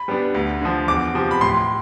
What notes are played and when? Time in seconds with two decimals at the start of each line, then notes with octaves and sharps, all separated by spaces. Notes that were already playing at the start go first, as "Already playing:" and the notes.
Already playing: B5
0.08 G3 B3 D4
0.34 D2
0.62 D3 F3
0.88 E2 D6
1.14 C3 F3
1.31 B5
1.41 A2 C6